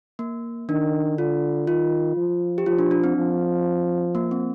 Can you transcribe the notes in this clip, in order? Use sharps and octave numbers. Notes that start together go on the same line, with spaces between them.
A#3
D#3 D4
D3 F4
D#3 F4
F3
G4
F3 F4
D4
D4
C4
F3
A#3
C4